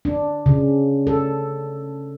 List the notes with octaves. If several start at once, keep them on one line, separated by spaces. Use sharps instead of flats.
D4
C#3
A4